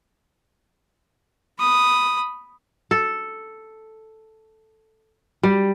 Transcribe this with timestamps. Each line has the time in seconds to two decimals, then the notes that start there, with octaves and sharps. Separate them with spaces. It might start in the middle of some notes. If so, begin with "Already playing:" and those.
1.58 B5 D#6
2.91 A4
5.43 G3